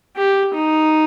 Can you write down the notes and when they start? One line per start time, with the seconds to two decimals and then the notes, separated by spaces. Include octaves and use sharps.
0.16 G4
0.54 D#4